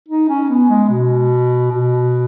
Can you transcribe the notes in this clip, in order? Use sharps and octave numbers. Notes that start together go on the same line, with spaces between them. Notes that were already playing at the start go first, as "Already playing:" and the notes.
D#4
C#4
B3
G#3
B2
B2